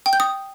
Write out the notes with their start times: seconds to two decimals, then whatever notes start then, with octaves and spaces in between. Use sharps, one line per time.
0.06 G5
0.13 G6
0.20 D#6